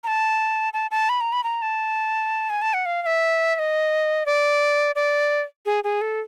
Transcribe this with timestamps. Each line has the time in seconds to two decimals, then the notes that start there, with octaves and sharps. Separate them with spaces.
0.04 A#5
0.07 A5
0.73 A5
0.91 A5
1.09 B5
1.21 A#5
1.32 B5
1.44 A#5
1.62 A5
2.50 G#5
2.62 A5
2.74 F#5
2.86 F5
3.02 F5
3.06 E5
3.55 E5
3.59 D#5
4.26 D5
4.95 D5
5.66 G#4
5.84 G#4
6.01 A4